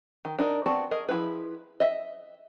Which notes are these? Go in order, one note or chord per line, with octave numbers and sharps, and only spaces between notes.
D#3
D4 D#4 A#4
B3 C4 F#4 D5 A5
G#4 A#4 D#5
F3 C4 E4 G#4 B4
D#5 E5